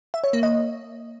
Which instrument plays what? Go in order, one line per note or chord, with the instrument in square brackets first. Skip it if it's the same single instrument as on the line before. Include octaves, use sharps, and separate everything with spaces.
[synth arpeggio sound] E5
C#5
A#3
D#5